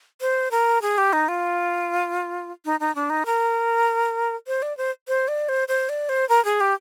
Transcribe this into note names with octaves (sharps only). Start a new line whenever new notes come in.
C5
A#4
G#4
G4
D#4
F4
D#4
D#4
D4
D#4
A#4
C5
D5
C5
C5
D5
C5
C5
D5
C5
A#4
G#4
G4